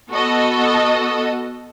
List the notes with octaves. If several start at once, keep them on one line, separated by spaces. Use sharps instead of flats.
B3 F#4 A4 D#5